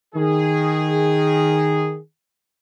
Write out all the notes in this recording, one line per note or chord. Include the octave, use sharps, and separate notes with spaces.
D#3 G#4